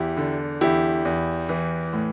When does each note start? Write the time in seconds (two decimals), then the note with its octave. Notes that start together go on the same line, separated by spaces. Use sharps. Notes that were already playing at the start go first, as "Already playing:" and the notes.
Already playing: E2 E4 G4
0.17 D3
0.61 E2 E4 G4
1.05 E2
1.49 E3
1.93 A2